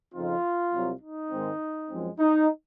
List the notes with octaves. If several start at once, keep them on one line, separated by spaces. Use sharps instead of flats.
F2 C#3 F3 C4 D#4 F4
C2 C3 F#3
D#4
G#2 D#3 G#3 C4
F#2 F3 G#3 C4
D#4